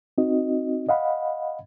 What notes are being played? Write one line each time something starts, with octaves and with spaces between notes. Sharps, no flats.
C4 D#4 F#4 D#5
D#5 F5 F#5 B5